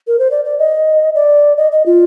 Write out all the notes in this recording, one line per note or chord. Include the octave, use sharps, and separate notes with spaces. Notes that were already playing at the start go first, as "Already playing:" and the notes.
A#4
C5
D5
D5
D#5
D5
D#5
D#5
F4